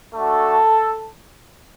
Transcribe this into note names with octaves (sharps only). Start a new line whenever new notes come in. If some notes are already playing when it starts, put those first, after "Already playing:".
A3 D4 F#4 A4